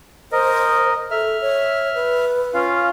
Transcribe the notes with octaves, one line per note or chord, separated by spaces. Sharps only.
A#4 C5 D#5
A4 E5 F6
C#5
B4
C#4 F4 F5